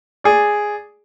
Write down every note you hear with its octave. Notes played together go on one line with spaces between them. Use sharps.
G#4 D5